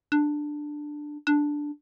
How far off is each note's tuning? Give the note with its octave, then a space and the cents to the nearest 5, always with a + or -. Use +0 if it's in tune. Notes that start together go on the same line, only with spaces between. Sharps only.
D4 +10
D4 +0